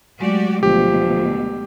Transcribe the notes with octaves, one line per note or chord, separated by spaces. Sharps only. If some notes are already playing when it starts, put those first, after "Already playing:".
F#3 G#3 A3 F#4 G4 D5
D2 B2 D3 F3 G4